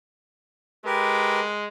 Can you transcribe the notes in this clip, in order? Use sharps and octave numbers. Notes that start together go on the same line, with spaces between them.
G#3 G4 A#4 B4